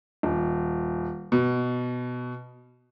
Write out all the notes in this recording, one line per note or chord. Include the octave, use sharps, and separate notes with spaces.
D#1
B2